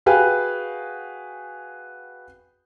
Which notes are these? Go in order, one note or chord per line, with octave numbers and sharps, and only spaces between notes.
F#4 G#4 B4 F5 G5 G#5